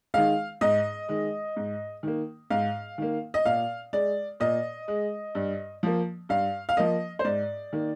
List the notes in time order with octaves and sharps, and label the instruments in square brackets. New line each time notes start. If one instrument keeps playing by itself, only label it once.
[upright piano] D#3 G#3 F5
G#2 D#5
D#3 G#3
G#2
D#3 A#3
G#2 F5
D#3 A#3
D#5
A#2 F5
G#3 D5
A#2 D#5
G#3
G2
F3 A#3
G2 F5
F5
F3 A#3 D#5
C5
G#2 D5
D#3 A#3